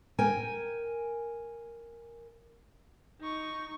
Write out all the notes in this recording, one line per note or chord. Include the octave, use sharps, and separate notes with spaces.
A#4 G5 G#5
D#4 C#6